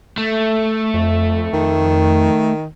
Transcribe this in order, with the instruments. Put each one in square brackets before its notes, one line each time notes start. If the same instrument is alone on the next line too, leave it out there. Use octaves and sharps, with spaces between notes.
[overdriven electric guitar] A3
[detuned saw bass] F2
[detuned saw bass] F2 [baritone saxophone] D#3